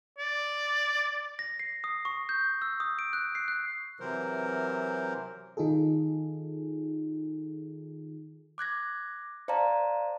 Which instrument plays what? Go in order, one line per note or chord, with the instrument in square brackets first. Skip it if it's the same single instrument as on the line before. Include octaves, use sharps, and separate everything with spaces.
[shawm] D5
[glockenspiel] A#6
C7
D#6
C#6
G6
E6
D#6
D7
F#6
C7
F#6
[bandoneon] C3 E3 F#3 A#4 C5
[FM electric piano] D#3 D#4 F4 G#4 A4
[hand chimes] D6 F#6 G#6 A#6
C5 D5 F5 A5 A#5